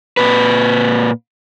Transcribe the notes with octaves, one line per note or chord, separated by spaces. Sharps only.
A#2 B4